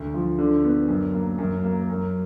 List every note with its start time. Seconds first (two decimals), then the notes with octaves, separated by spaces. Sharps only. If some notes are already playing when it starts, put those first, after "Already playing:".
Already playing: D2
0.14 F3
0.38 D3
0.64 B3
0.88 F#2
1.14 A#3
1.39 F#2
1.64 A#3
1.90 F#2